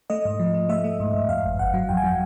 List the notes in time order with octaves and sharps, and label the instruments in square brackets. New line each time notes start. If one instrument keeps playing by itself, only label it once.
[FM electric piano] A3 D#5
G#2
F3
A3
A3 E5
A3
G#2
G#2
F2 F5
G1
G1 F#5
F#3
F2 G5
G#5
F#3 G5